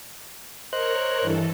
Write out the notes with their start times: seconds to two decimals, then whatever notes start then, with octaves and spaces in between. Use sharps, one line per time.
0.73 A#4 C5 C#5 D#5 F#6
1.21 G2 E3 A4